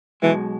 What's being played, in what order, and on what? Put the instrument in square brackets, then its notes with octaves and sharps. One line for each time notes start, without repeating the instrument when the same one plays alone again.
[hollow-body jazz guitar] B1 B2 G#3 [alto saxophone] E3